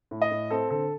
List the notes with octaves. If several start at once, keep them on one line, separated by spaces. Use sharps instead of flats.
A2
D#5
A2
C4 A4
D3 A4